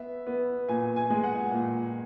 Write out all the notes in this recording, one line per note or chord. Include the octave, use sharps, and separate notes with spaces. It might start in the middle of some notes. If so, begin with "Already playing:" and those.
Already playing: B3 E5
B3
A#2 G#5
G#5
G#3
F#5
A#2